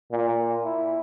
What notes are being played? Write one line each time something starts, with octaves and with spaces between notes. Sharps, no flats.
A#2
E4